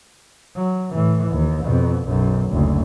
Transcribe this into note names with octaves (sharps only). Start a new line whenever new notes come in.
F#3
A2 E3
D#2
F2 B2
B1 F#2
F#1 D2